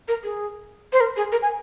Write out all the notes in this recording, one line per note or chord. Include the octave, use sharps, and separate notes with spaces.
A#4
G#4
C5
A#4
G#4
A#4
G#5